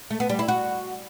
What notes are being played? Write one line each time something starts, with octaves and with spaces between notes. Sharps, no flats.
A3
B3
G3
E4
F#4